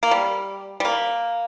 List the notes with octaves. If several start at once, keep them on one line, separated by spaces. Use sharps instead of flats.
A#3
G3
G3
A#3